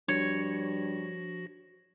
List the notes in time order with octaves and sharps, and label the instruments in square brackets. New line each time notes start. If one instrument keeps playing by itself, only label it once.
[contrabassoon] G2 [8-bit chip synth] F3 F#4 A#6 [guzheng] C#5